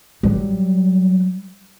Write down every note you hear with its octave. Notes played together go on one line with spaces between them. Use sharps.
F#3 G3